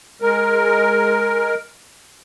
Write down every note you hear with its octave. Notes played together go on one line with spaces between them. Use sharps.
G#3 A#4